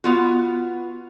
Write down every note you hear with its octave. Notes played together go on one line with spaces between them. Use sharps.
B3 F4 F#4